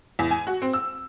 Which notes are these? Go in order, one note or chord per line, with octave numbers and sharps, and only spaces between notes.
E2
G#5
F#4
C4
E6